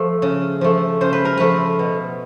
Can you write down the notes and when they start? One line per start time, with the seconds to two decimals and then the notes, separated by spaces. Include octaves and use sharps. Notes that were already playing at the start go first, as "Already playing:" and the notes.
Already playing: F3 A3
0.22 C#3
0.61 F3 A3
1.01 C#3 C5
1.13 B4
1.25 A#4
1.37 F3 A3 B4
1.79 B2